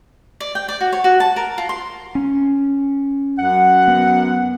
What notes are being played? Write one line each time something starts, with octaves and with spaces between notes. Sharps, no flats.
D5
G5
D5
F#4
C#5
F#4
A5
A#4
F4
C6
C#4
F#2 F#5
B3